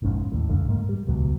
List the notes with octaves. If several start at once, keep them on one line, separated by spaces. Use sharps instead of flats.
F1 A#1 G#2 C#4
D#2 A2
F1 C#2 F#2 D3
G#2 A#3
G3
D#1 C#2 B2 F#3